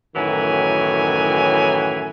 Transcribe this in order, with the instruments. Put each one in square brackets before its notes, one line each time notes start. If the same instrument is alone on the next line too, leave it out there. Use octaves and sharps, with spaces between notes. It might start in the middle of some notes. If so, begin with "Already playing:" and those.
[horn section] F#2 A2 D#3 E3 F#3 G#5